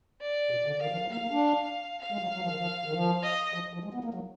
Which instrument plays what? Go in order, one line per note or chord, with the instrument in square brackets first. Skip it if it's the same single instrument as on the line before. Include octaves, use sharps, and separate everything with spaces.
[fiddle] D5
[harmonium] B2
D3
[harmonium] D#3 [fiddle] F5
[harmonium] F3
F#3
[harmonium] A#3 [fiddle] F5
[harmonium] A#3
D4
[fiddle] F5
[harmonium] G#3
F#3
F#3
F3
D#3
F3
D#3
F3
[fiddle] D#5
[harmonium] F3
F3
G#3
B3
A#3
F#3